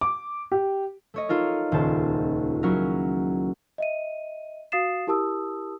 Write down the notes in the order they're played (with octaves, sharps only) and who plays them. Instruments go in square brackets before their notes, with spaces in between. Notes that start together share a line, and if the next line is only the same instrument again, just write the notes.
[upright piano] D6
G4
[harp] A3 C#5 D#5
D#4 F4 A4 A#4
D#1 C#2 C5 A5
F#3 A#3 C#4 E4 F#4 A#4
[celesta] D#5 E5 D#7
F#4 F5 D#6 A6 C7 E7
E4 G4 A#4 A5 D#6 E6